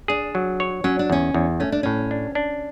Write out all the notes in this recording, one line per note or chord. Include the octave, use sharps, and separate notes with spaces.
D4 G#4
F#3
C#5
F#3 C#4
D4
E2 C#4
E2
A3 C#4
D4
A2 C#4
D4
D4